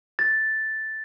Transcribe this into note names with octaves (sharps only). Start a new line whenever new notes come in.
A6